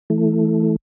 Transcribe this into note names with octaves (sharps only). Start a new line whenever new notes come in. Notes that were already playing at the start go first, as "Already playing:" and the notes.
E3 A3